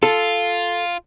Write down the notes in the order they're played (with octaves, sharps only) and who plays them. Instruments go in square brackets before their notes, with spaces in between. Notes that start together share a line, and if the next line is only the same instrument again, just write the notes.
[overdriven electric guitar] F4 [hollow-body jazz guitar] A4